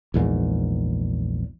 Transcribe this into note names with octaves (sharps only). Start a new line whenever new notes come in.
A#1 E2 G#2